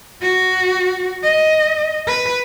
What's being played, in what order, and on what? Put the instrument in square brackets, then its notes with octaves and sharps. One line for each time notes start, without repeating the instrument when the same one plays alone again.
[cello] F#4
D#5
B4